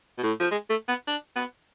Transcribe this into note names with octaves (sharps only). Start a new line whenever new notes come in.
B2
A2
F3
G#3
A3
B3
D4
B3